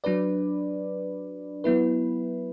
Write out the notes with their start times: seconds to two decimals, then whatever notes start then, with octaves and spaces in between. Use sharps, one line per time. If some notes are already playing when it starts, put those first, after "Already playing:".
0.04 F#3 D4 B4 D5
1.64 F#3 B3 E4 B4